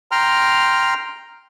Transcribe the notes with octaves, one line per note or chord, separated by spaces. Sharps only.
G5 A#5 C6 F6